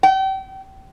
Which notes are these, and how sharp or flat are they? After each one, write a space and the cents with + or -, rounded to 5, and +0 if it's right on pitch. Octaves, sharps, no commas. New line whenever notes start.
G5 -35